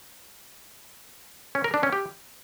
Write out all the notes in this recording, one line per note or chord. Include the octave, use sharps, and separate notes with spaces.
C#4
A#4
D4
C#4
G4